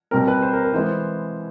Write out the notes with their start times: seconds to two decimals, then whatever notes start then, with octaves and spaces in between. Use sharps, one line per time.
0.11 B2 G3 C4 A#4
0.28 B4
0.42 C5
0.53 A#4
0.64 A#4
0.74 E3 G#3 B3 C5